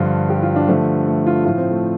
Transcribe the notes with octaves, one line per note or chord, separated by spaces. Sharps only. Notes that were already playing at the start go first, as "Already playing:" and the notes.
Already playing: G2 D3 F3 F4
G4
F4
D4
G2 D3 F3 A3
A3
F4
A2 F3 F4
C4
A3